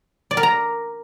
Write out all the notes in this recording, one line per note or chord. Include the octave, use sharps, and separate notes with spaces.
D5
A#4
A#5